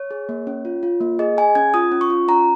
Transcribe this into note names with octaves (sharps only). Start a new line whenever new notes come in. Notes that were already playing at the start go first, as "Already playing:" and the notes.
Already playing: C#5
G#4
A#3
C#4
F4
F4
A#3
G#4 D#5
G#4 G#5
C#4 G#6
F4 D#6
C#4
C#6
F4
C#4 A#5